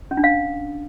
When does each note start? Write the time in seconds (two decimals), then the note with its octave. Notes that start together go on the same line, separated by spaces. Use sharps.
0.11 C#4
0.17 D4
0.24 F5